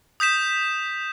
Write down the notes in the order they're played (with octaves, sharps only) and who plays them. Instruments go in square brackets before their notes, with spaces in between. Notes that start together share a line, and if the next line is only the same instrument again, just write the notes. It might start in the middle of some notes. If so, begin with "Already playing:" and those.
[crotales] D#6 G6 B6 E7